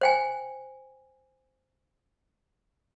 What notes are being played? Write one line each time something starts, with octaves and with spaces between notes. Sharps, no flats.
C5 G5 G#5